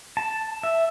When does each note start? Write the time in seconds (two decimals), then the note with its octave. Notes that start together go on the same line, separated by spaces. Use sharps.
0.17 A5
0.63 E5